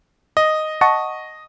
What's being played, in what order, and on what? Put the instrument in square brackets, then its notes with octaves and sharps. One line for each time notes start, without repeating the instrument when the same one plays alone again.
[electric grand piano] D#5
[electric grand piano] D#5 [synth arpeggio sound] F#5 A5 C#6